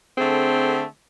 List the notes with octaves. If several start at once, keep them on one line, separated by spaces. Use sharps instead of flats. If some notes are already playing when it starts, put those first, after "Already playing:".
D3 A3 C4 G#4